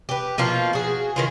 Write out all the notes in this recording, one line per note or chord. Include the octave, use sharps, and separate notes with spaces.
G4 B4
B2 F3 A#3 F4
F#4 G#4
D#3 E3 F4